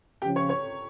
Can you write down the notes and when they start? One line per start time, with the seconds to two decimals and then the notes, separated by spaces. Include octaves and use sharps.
0.22 C#3 F3 C#4 G4 G5
0.36 C#5 C#6
0.49 C#5 C#6